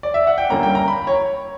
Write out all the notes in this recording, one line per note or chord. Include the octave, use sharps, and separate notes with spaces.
D5
E5
F#5
G5
G2 D3 G3 A#3 C#4 A#5
G5
A#5
B5
C#5